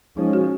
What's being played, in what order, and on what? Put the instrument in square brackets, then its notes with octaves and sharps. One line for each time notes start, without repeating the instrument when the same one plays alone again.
[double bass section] F3 G#3 C#4 [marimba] D#4
[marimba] F#4